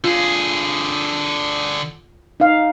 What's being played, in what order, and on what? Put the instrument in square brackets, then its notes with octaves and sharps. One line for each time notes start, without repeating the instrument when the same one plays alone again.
[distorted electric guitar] D3 G#4 [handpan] F4
[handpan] D#4 F5